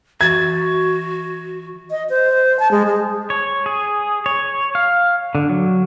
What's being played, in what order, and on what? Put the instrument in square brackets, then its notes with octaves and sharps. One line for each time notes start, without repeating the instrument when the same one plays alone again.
[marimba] E3 A6 [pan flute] F#4 [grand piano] G#6
[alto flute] D#5
C5
A5
G#3
G#3
[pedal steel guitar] C#5
G#4
C#5
F5
D3
F#3